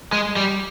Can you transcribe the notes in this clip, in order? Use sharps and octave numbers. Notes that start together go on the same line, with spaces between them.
G#3
G3